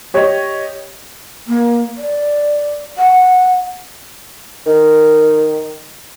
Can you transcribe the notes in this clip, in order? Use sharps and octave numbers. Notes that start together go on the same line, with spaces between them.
G4 C#5 D#5
A#3
D5
F#5
D#3